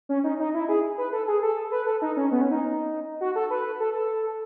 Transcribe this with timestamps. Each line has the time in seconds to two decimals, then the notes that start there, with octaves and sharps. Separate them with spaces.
0.09 C#4
0.24 D#4
0.39 D#4
0.54 E4
0.69 G#4
0.98 B4
1.13 A4
1.28 G#4
1.42 A4
1.72 B4
1.87 A4
2.02 D#4
2.17 C#4
2.32 B3
2.41 C#4
2.51 D#4
3.21 F#4
3.35 A4
3.50 B4
3.80 A4
3.94 A4